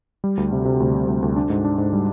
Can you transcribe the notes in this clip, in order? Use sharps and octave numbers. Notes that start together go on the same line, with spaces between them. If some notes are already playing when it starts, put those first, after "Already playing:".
G3
D2
C3
C3
D2
C3
D2
D2
D4
G#2
D4
G#2
G3